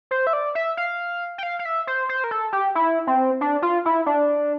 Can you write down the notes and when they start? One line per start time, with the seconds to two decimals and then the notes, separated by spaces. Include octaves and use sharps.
0.11 C5
0.27 E5
0.33 D5
0.55 E5
0.77 F5
1.38 G5
1.43 F5
1.59 F5
1.65 E5
1.87 C5
2.09 C5
2.24 A#4
2.31 A4
2.53 G4
2.75 E4
3.07 C4
3.41 D4
3.62 F4
3.85 E4
4.06 D4